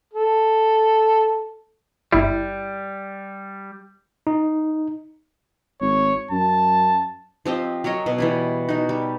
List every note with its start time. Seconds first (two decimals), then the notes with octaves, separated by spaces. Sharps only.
0.13 A4
2.12 G1 G3 E4
4.27 D#4
5.81 G#1 C#5
6.31 F#2 A5
7.46 F3 C4 G4 D#5
7.84 F#3 A#4 C#5 D#5
8.06 B2
8.18 E3 G3 E4
8.69 D#4 F#4
8.89 G3